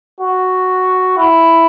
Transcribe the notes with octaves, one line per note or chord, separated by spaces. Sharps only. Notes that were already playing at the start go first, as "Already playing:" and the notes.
F#4
E4